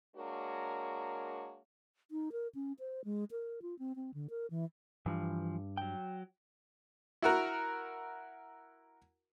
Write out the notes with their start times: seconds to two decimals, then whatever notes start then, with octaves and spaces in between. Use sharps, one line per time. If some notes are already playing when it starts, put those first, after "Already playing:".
0.16 G#3 A#3 D4 F#4 A#4 C#5
2.11 D#4
2.32 A#4
2.55 C#4
2.79 C5
3.05 G#3
3.31 A#4
3.62 F4
3.79 C4
3.96 C4
4.14 D3
4.30 A#4
4.51 E3
5.06 G2 E3 F3
5.77 F#3 G5
7.22 E4 F#4 A#4